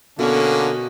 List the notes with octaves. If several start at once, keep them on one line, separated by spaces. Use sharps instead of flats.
B2 D3 A#3 C#4 A4 C#6